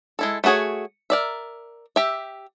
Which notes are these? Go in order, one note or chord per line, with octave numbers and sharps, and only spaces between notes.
G#3 E4 A4
A3 B3 F#4 G#4 C#5
A#4 D5 E5
G4 E5